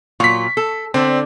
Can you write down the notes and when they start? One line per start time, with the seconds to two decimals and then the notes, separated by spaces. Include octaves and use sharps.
0.20 A#2 F#3 F4 C#6 B6
0.57 A4
0.94 D3 C4 D4